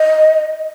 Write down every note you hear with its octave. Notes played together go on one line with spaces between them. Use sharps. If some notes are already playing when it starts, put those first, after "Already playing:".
Already playing: D#5